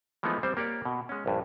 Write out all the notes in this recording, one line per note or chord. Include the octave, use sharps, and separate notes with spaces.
E3 F3 G#3 A3 B3 D#4
G3 C4 C5
A#3 G4 C#5 D5
B2
G#3 C#4
A#1 G2